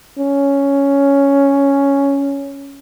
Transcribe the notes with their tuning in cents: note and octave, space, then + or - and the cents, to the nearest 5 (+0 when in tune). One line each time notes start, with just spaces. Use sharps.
C#4 +5